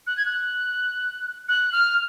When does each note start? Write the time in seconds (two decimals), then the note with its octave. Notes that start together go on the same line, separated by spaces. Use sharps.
0.07 F#6
0.17 G#6
0.25 F#6
1.49 F#6
1.72 F6